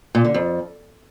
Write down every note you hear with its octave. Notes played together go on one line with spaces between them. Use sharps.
A#2
D3
F2